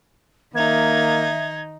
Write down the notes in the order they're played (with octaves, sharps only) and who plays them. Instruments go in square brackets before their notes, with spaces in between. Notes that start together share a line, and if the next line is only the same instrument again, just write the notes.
[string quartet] D#3 D#4 [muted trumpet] A#3 [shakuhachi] E5 [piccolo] G#6